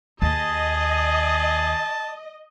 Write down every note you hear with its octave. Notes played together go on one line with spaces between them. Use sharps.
D#2 G#4 D#5 A5